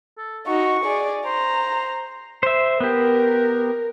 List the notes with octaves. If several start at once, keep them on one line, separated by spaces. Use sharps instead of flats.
A4
D#4 F#4 C#6
G#4 D5
C5 A#5
C5 E5
B3 G4 A#4